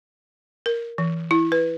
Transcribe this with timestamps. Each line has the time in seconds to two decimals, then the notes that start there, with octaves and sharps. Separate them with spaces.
0.66 A#4
0.98 E3
1.31 E4
1.52 B4